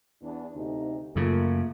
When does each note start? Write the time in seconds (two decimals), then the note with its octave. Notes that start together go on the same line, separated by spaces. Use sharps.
0.22 E2 D4
0.55 D2 C3 D#4
1.16 F#2 C#3 A3 A#3 F4